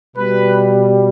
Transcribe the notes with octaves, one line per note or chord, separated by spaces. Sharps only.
B2 G3 B4